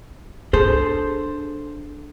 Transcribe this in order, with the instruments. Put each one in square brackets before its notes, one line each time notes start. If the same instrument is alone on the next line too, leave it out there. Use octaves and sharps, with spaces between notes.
[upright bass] D4 [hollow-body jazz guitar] G#4 A4 C5